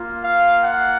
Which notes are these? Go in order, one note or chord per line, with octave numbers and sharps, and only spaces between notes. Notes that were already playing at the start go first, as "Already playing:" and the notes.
Already playing: A#3 F4
F5
F#5